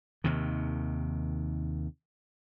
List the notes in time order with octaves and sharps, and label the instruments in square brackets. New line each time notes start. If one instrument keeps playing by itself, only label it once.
[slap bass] D#2 C3 D#3